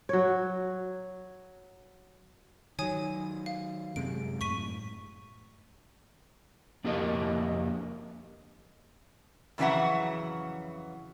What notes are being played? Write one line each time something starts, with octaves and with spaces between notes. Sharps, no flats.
F#3 C#5
D#3 F#3 C#5 G#5 D#6
F5
F#2 C3 G#3 D7
F#2 A2 C#6 B6 D#7
F2 A#3 D4 G4 A#4 D#5
F2 C#3 E3 F#3 E5 F#5